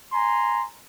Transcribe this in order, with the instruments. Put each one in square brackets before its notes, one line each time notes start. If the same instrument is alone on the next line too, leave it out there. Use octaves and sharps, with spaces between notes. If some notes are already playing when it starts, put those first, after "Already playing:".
[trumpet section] G#5 A#5 C6